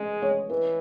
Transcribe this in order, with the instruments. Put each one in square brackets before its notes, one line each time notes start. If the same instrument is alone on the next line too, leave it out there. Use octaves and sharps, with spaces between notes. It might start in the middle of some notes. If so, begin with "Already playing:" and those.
Already playing: [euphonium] G#3 [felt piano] D#5
[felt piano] C#5
[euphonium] E3 [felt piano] B4